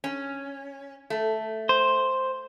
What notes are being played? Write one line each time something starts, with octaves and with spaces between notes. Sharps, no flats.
C#4
A3
C5